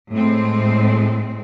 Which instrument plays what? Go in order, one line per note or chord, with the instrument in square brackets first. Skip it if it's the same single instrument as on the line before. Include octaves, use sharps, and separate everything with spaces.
[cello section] A2 G#3 C4